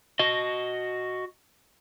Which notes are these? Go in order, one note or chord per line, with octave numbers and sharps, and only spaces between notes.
F#4 D#5